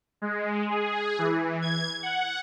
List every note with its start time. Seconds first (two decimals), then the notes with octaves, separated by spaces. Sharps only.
0.22 G#3
0.69 G#4
1.18 E3
1.61 G#6
2.03 F#5